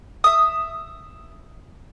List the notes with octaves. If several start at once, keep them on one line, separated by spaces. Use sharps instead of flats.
E5 D#6